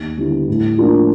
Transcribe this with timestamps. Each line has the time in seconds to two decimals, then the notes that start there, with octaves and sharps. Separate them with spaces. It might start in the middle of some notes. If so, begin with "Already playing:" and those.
Already playing: D#2
0.17 D3 G3 B3 E4
0.48 A2
0.78 F3 A#3 D4 F4